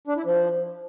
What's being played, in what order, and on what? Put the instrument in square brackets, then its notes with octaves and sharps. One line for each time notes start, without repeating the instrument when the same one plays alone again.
[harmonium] D4
E4
F3